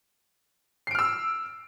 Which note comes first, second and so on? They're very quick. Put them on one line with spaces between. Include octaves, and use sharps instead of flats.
C7 D7 F6 E6